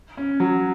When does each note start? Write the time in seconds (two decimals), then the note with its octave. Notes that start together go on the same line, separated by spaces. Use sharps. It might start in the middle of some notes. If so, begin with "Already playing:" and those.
0.17 C#4
0.40 F#3